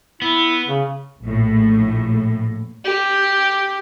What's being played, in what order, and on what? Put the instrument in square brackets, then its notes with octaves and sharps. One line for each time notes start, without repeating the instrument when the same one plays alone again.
[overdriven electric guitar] B3 [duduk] E4
[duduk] C#3
[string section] A#1 A2
[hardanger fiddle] G4